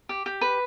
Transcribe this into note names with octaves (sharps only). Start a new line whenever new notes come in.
G4
G4
B4